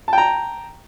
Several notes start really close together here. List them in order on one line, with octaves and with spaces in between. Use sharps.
A5 G5 A#5